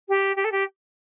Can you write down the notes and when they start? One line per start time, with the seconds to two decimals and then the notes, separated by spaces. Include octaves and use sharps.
0.08 G4
0.36 G4
0.44 A4
0.51 G4